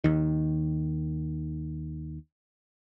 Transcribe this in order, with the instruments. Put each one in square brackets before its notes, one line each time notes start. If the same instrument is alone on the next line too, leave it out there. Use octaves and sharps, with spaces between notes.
[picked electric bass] D#2 D#3